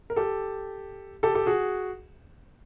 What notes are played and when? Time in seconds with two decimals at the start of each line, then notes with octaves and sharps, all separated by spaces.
0.10 A#4
0.16 G4 A4
1.23 G4 A4
1.35 G4 A4
1.46 F#4 G#4